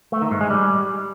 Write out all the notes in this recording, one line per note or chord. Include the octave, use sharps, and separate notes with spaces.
A3
D#3
G#2
G#3
G3